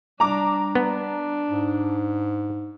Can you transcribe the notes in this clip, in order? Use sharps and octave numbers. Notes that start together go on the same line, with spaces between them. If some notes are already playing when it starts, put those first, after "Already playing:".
G3 D4 A#5 D6
B3 D4
G#2